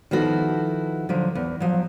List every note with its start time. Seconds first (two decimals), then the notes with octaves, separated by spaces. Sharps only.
0.11 D#3 F3 B3 E4 F#4 A4
1.09 D3 F3 F#3
1.35 E2
1.60 F3 F#3